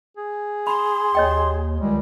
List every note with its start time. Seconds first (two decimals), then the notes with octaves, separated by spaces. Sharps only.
0.17 G#4
0.67 B5 C6
1.15 D#2 C#5 D#5 G5
1.81 C#2 D#3 G3 G#3